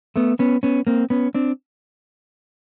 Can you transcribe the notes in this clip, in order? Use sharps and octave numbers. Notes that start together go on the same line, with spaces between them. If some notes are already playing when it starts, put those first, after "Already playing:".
A3 B3
B3 C#4
B3 C#4
A#3 C4
B3 C#4
C4 D4